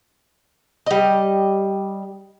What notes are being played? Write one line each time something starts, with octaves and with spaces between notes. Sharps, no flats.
G3 D#5